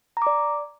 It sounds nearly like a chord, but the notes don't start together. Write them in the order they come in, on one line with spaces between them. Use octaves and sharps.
A#5 D6 D5